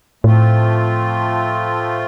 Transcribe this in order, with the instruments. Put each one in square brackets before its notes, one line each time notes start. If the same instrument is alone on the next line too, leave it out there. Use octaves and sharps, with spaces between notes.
[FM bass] A2 [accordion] F3 A3 C4 F4